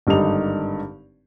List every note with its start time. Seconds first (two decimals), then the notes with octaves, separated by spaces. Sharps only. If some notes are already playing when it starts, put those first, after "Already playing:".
0.07 G#1 G2 D3 D4 D#4 F7